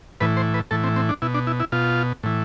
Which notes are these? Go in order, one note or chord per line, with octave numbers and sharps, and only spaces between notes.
A2 E3 B4
C5
B4
A2 E3 A4
C4
C4
D4
B2 E4
D4
E4
E4
B2 F4
A2 E3